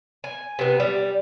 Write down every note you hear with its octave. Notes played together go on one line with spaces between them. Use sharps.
G#5
C3 B3
G3